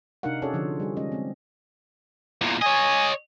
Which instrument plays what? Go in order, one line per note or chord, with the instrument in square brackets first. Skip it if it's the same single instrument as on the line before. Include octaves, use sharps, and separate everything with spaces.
[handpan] C3 D4 D#4 A#4 F5 F#5
C#4 F#4 G#4 A4 C#5 D5
D3 F3 F4
G3 G#4
G#3 C#4 D#5
G#3 C4
[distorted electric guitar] E2 A#2
[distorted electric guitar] C#5 D#5 [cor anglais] G#5